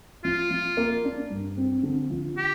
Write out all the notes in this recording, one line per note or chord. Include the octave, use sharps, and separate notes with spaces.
F3 F4
F3
A#3
D4
G2
C4
D3
F3
G4